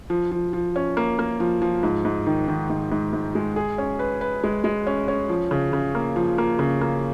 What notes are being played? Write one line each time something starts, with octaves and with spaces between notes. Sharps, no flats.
F3
F3
F3
C#4
A#3
A#3
F3
F3
G#2
G#2
D#3
D#3
G#2
G#2
G#2
G#3
G#4
C#4
B4
B4
G#3
G#3
C#4
C#4
F3
C#3
C#3
A#3
F3
A#3
C#3
A#3